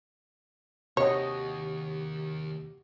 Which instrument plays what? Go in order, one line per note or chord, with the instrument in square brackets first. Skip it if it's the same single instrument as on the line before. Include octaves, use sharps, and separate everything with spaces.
[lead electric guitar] D#2 [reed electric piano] C3 D#3 G4 [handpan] F#4 D#5 [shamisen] C#5